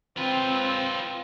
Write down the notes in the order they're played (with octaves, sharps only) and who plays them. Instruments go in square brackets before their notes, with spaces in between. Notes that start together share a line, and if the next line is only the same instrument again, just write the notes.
[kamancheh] C4 [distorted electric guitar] F4 B4